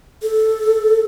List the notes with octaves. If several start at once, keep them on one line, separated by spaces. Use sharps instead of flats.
A4